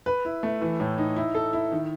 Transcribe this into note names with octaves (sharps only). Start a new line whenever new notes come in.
B4
E4
A3
E3
A2
D#4
E4
A4
E4
D#3